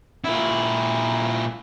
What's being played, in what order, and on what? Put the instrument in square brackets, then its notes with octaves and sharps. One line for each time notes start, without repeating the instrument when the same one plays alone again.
[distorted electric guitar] A#2 E4